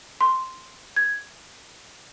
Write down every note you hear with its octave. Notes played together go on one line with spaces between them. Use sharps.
C6
G#6